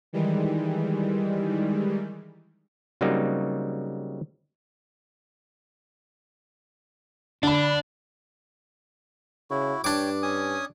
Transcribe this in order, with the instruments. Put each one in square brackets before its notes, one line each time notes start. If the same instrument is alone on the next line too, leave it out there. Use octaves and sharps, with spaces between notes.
[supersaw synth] D#3 E3 G3 G#3
[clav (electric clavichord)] C#3 F#3 G3 A#3 C4 D#4
[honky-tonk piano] D3 B5 [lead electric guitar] D4
[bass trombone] C#3 [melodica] E4 F#4
[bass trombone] G2 [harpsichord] D4 D6 [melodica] C#5 G5
[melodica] C#4 G#5 D#6